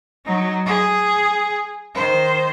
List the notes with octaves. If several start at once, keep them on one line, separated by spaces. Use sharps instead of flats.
F#3 D#4
G#4
D#3 C5